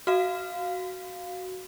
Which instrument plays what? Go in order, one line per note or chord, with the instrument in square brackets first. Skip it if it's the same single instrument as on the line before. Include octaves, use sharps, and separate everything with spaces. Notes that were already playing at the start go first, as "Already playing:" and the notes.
[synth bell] F#4 F5